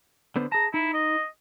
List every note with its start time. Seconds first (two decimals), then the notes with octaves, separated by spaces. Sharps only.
0.36 D3 B3 C5
0.52 G#4 A5 A#5
0.74 D#4 E4
0.93 D#5